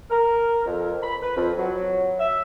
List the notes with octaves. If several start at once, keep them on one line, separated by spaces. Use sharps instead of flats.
A#4
F2
B5
B4
F2
F#3
E5